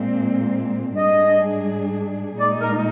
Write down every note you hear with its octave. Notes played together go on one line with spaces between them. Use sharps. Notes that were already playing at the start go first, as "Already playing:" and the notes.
Already playing: A#2 G#3 C4
G#2 G3 D4 G#4 D#5
A#2 G#3 D#4 D5
A#4